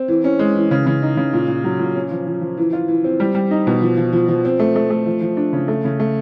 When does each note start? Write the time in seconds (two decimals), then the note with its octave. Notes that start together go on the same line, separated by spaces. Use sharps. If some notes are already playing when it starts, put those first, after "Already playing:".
Already playing: C4
0.08 E3
0.24 C#4
0.39 G#3
0.55 E3
0.71 C#3
0.87 C#3
1.02 D#4
1.17 C#3
1.33 A#2
1.48 A#2
1.64 F#3
1.79 A#2
1.95 C#4
2.11 F3
2.27 F3
2.41 F3
2.57 E3
2.73 F4
2.88 E3
3.04 C4
3.20 G3
3.35 G3
3.51 D#4
3.67 B2
3.82 F3
3.97 F3
4.13 F3
4.28 F3
4.45 C4
4.60 A3
4.76 A3
4.90 A3
5.06 F3
5.22 F3
5.37 D4
5.53 C#3
5.68 A3
5.85 C#3
6.00 A3